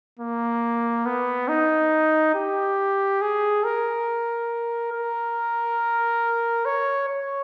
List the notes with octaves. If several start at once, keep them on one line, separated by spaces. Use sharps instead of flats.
A#3
B3
D#4
G4
G#4
A#4
A#4
C#5
C#5